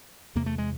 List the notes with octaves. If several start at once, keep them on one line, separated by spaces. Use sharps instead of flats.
E2 C3 A#3
A3
G#3